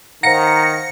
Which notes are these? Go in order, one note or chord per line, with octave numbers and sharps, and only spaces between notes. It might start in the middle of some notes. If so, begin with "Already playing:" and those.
D#3 C5 F5 F#5 A#5 A#6 C#7